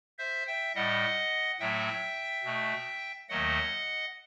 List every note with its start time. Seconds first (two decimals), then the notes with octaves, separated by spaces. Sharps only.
0.18 C5 E5
0.47 E5 G5
0.75 A2 G3 D#5 F#5
1.60 A2 F#3 A3 E5 G5
2.44 B2 A3
3.29 D#2 D#3 F#3 A3 D#5 F#5